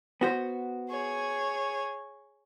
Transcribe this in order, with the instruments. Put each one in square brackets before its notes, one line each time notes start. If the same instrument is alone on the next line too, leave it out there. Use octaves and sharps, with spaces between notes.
[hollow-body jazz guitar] B3 F#4 C5
[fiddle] G#4 C#5